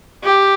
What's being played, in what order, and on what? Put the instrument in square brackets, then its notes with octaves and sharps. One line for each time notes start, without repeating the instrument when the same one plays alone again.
[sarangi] G4